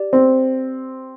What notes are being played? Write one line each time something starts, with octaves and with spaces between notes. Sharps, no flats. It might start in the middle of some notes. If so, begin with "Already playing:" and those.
Already playing: G4 D5
C4